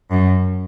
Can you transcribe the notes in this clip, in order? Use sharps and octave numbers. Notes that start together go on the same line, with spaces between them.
F#2